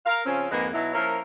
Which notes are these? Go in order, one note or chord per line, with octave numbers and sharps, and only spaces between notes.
A#4 F5
C#3 F3 C4 C#4
F2 G#2 G#3 A#3 G#4 B4
B2 F#3 D#4 E4
F3 A#3 C#4 E4 A#4